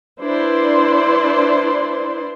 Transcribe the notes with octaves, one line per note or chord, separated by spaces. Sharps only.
D4 E4 B4 C5 D5 C6